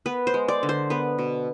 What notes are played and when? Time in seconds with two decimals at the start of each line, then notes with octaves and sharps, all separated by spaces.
0.06 B3 B4
0.27 C5
0.34 G#3
0.48 D5
0.63 D3
0.69 C5
0.90 B3 B4
1.19 B2